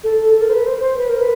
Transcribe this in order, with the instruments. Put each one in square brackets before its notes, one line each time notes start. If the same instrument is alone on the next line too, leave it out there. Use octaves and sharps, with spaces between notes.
[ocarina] A4
A4
A#4
C5
B4
C5
C5
B4
A#4
B4